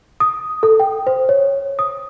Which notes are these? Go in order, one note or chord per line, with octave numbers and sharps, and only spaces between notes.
D#6
A4
G5
C5
C#5
D#6